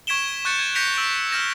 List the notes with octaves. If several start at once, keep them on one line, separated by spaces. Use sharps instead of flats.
C#6 G#6 B6 D7 E7 G7
C#6 F#6 G6 A6 C#7
G#6
G6 A#6 B6 C#7 D7 F7
E6 D7
E6 F6 G6 A#6 E7